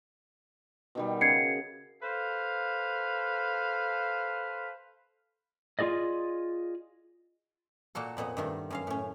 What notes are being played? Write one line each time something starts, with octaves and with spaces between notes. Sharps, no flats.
B2 D#3 G3
C#3 G#6 C7 C#7
A4 B4 C5 F5
F4 F#4 G#4 D5 D#5
A#2 A#3 F#4 A4
F2 A#2 B3 D#5
G2 D#3 A3
F#2 C#4 F5
A2 C#4